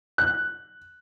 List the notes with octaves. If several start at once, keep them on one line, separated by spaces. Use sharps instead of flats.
F#6